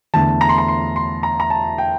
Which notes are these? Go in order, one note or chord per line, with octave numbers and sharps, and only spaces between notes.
E2 D3 A3 A5
A#5
C6
A#5
C6
C6
A#5
A#5
A5
G5